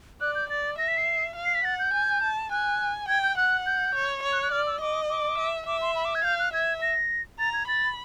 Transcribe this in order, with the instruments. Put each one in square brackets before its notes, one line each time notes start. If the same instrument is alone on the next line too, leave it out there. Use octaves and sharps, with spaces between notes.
[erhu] D5 [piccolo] F#6
[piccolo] G6
[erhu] D5 [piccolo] A6
[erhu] E5 [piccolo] A#6
[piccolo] B6
C7
[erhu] F5
[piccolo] C7
B6
[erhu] F#5 [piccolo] A6
[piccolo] G6
[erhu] G#5
A5
[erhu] G#5 [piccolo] F#6
[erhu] G5 [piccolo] G#6
[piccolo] G6
[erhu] F#5 [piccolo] F#6
[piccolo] G6
[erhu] C#5
C#5
[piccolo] F#6
F#6
[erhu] D5 [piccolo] F6
[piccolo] E6
[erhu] D#5 [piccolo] D6
[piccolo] D6
[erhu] E5
[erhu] E5 [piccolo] D6
[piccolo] C6
B5
D6
G#6
[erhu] F5 [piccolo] G6
[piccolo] F#6
[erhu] E5 [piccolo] G#6
[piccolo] A#6
[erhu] A#5 [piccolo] A6
[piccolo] G#6
[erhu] B5 [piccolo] A6